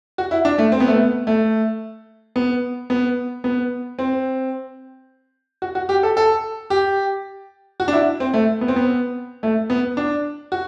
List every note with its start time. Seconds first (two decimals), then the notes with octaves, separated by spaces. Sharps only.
0.18 F#4
0.31 E4
0.45 D4
0.58 A3
0.72 C4
0.80 B3
0.88 A3
0.95 B3
1.27 A3
2.36 B3
2.90 B3
3.44 B3
3.99 C4
5.62 F#4
5.75 F#4
5.89 G4
6.03 A4
6.17 A4
6.70 G4
7.80 F#4
7.88 D4
7.93 E4
8.20 C4
8.34 A3
8.61 B3
8.68 C4
8.76 B3
9.43 A3
9.70 B3
9.97 D4
10.52 F#4